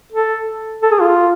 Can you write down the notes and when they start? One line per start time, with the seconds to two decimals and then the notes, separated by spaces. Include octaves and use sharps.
0.13 A4
0.83 A4
0.91 G#4
1.01 F4